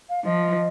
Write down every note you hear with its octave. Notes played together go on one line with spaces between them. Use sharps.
F5
F3 D#5